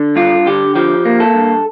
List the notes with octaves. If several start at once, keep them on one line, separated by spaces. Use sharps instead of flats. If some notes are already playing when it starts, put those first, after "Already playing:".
Already playing: D3
G2 F4
D3 G4
F3 G4
A#3
A4
G2